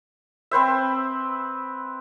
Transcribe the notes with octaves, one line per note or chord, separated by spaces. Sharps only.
C4 B4 C5 E5